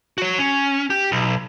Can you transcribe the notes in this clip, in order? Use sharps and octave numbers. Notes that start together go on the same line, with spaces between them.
F#4 C#5
C#4
G4
B1